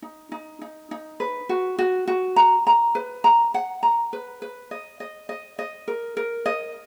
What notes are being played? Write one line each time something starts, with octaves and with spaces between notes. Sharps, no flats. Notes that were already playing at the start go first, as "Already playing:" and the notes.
D#4
D#4
D#4
D#4
B4
F#4
F#4
F#4
A#5
A#5
B4
A#5
F#5
A#5
B4
B4
D#5
D#5
D#5
D#5
A#4
A#4
D#5